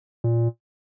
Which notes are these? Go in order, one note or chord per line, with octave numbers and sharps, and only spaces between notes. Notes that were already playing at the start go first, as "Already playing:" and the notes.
A#2